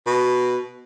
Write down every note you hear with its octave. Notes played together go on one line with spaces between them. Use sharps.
B2